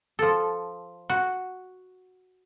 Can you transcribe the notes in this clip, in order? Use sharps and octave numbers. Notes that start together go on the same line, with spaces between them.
F3 A4
F#4